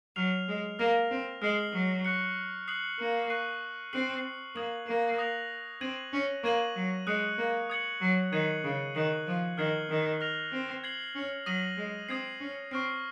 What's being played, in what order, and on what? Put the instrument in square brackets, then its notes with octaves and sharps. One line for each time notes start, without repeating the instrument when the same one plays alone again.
[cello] F#3 [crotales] F6 C7 F7
[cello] G#3
[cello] A#3 [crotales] F6 A#6 F7
[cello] C4
[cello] G#3 [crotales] F6 C7 F#7
[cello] F#3
[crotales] C#6 F#6 C#7
D#6 F#6 C7 F#7
[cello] A#3
[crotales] C#6 F#6 C7 D#7
[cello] C4 [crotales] F#6 C7 F#7
[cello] A#3 [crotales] D#6 G#6 C7 F#7
[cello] A#3
[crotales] D#6 F#6 A#6 F7
[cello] C4 [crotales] G#6 D#7 F#7
[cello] C#4
[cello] A#3 [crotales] C#6 G#6 D#7 F#7
[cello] F#3
[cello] G#3 [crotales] D#6 F#6 C#7
[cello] A#3
[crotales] D#6 G#6 C#7 F#7
[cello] F#3
[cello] D#3 [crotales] G#6 C7 D#7 F#7
[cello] C#3
[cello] D#3 [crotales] F#6 C7 F#7
[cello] F3
[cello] D#3 [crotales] F6 G#6 C7 F#7
[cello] D#3
[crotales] F6 A#6 F7
[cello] C4
[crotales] G#6 C7 F#7
[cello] C#4
[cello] F#3 [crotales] D#6 A#6 D#7 F#7
[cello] G#3
[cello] C4 [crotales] D#6 G#6 C7
[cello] C#4
[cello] C4 [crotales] C#6 F6 C7